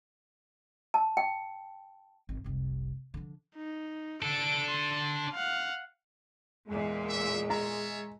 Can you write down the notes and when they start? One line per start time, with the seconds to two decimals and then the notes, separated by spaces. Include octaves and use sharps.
0.94 A5
1.17 G5
2.29 G#1
2.44 F1 C2
3.14 D3 F3
3.56 D#4
4.22 D4 A4 D7
4.70 C6
5.33 F5 F#5
6.67 E2 A#2 G#3
7.10 E5
7.50 F4 C#5 E5 A#5